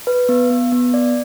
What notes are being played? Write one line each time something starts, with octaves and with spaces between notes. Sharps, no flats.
B4
B3
B3
B3
D5